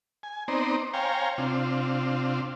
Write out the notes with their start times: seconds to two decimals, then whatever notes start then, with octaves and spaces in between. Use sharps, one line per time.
0.23 G#5
0.48 B3 C4 D#4 C5 D5 A#5
0.94 C5 C#5 F5 G5 G#5 A#5
1.38 C3 C4 D4 F4